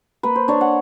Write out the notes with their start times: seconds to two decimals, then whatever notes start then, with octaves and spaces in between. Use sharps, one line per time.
0.23 A#3 B4
0.36 C5
0.48 D4 C#5
0.61 F#5